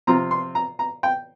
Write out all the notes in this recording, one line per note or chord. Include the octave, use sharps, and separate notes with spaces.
C3 F3 C4 F4 A#5
C6
A#5
A#5
G5